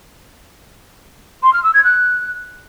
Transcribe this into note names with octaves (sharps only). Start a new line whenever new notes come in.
C6
F6
E6
G#6
F#6